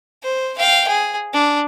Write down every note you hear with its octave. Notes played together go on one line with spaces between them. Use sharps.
C5
F5 G5
G#4
D4